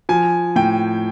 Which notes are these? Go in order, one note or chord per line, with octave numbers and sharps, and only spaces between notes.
F3 G#5
A2 G5